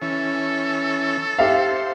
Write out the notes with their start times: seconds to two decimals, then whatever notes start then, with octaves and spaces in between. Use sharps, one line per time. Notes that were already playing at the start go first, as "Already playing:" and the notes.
0.02 E3 C#4 A4
1.38 G4 C5 E5 F5